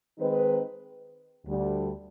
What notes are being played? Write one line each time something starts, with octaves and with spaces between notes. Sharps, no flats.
D#3 G#3 C4 D#4 B4
D2 D3 G3